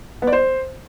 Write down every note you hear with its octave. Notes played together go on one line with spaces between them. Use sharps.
B3
D5
C5